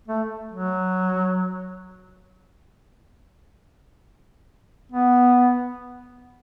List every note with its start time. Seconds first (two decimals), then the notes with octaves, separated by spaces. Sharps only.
0.08 A3
0.52 F#3
4.92 B3